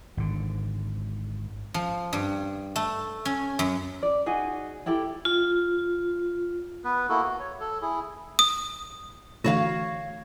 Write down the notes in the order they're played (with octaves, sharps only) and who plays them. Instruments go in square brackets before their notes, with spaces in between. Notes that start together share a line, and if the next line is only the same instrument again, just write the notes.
[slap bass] G#1 D3
[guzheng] F3
G2
A3
C#4
F#2
[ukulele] D5
D#4 F#4 G#4
E4 G4 A4 G5
[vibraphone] F4
[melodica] B3 B4
A#3 E4 F#4 A4
F#4
C#5
A4
E4 G#4
[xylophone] D#6
[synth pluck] D3 E3 A3 [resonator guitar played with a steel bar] F#4 C#5 F5